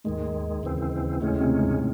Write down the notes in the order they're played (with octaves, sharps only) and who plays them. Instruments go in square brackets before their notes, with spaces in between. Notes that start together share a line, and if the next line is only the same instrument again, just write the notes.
[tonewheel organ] D#2 D#3 G#3 [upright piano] G#2
[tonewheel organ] D#2 C#3 E3 C4
[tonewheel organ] D#2 C#3 G#3 C#4 [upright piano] A2
[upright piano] C3
G#2